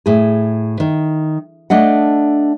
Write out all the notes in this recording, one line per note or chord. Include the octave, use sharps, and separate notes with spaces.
A2 G#4
D#3
A3 D4 D#5 F#5